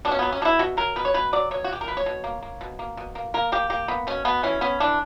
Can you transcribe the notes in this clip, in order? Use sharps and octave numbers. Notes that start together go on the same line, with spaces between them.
B2 D4
C#4
F#3 B3
C#4
B2 D4 E4
B2 F#4
F#3 A#4
B2 B4
C#5
B2 B4
F#3 D5
B2 C#5
F#4
B2 G4
A#4
B2 B4
C#5
B2
A#3
A#3
B2
A#3
B2
A#3
A#3 A#4
A#3 G4
A#3 G4
A#3 B3
B2 C#4
B2 B3
E3 C#4
B3 C#4
E3 D4